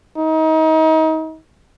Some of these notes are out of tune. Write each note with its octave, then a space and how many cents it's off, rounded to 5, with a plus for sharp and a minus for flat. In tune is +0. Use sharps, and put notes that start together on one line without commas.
D#4 +30